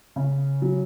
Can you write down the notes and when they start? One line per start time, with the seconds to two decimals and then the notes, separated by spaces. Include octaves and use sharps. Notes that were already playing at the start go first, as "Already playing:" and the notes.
0.16 C#3
0.62 F#3